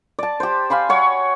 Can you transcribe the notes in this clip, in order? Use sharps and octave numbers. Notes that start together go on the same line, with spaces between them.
D5 A5
G4 C5
F5 G#5 B5 C6
F#4 C#5 F#5